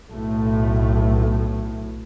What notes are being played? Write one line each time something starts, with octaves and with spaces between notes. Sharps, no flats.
B1 A2 A3